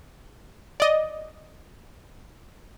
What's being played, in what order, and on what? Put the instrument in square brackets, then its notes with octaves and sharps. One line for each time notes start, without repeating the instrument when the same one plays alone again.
[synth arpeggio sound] D5 D#5